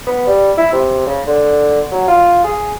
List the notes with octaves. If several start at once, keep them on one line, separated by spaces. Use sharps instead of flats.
B3
G3
E4
C3
C#3
D3
F#3
F4
G#4